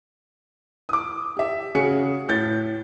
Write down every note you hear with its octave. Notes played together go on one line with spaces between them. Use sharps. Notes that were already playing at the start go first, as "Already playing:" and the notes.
D6 D#6
G4 E5
C#3 F#4 G#4 C#7
A2 G6 A6